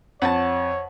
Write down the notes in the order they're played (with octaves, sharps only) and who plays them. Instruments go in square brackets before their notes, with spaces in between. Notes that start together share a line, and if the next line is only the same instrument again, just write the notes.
[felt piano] F2 [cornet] C#5 [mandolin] F#5 G5 A5